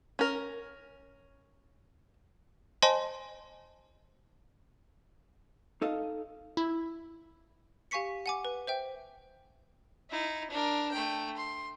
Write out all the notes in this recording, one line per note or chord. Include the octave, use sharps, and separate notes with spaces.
C#4 A#4
C5 D#5 G#5 A5 C6
D#4 A4 D#5 F5
E4
G4 F5 G#5 C#6 B6 C#7
F#5 G#5 D6
B4
C5 E5 G5
D#4 E4
D4 A#4
A3 G5
C6